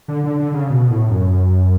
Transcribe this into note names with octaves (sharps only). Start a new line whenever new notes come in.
D3
D3
D3
C#3
B2
A2
F#2